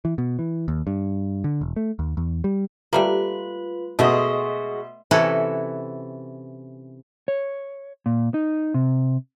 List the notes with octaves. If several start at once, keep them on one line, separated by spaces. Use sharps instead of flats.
E3
B2
E3
D#2
G2
D3
E1
A3
D#2
E2
G3
G3 A3 A#3 F4 B4 B5
B2 G#3 A3 F#4 D#5 E5 C6
C3 E3 C#4 E4 F#4 A4
C#5
A#2
D#4
C3